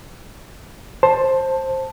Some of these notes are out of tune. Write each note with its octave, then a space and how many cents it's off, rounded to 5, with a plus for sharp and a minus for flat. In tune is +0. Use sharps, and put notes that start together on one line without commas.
C5 +15 A5 +5